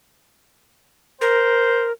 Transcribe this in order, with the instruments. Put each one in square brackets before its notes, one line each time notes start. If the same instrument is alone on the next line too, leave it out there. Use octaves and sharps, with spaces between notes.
[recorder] A#4 [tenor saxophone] C5